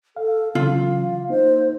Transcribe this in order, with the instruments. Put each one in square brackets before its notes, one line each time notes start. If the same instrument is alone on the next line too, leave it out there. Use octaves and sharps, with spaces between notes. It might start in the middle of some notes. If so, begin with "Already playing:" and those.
[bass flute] A4 [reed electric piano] F5
[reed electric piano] C#3 E3 F#3 [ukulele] F4 [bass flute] F5
[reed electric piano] A#3 D#4 [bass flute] C5